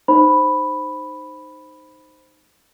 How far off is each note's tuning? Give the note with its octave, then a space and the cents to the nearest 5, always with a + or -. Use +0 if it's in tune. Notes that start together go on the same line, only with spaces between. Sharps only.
D#4 -10 C5 +0 B5 +0